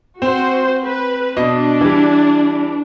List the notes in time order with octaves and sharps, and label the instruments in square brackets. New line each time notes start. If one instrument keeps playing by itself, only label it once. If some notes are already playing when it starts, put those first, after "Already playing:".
[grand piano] C4 [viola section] F#4 C5
[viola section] B4
[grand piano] B2 D#5 [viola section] D4
[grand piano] E3 G3